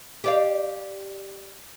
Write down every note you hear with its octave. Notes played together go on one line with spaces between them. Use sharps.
G4 D5 F5